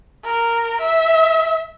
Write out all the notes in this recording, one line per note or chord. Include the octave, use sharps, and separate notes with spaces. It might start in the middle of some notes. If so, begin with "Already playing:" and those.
A#4
E5